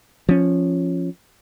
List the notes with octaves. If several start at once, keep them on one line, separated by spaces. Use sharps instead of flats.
F3 C#4